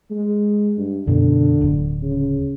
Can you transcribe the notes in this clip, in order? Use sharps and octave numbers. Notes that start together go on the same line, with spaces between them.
G#3
G2
F#2 B2 D3 B3
D1
C#3